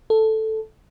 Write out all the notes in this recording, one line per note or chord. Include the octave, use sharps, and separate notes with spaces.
A4